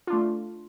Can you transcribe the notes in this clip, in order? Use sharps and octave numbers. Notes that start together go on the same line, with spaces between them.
A3 D4 F4